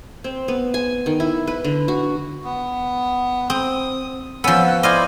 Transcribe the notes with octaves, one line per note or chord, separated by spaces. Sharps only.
C4
B3
G#5
D#3
E4
B4
D3
F#4
B3
C4 D#6
F3 B3 C#4 E6
F#5
E4 C5 D5 D#5 F5 G#5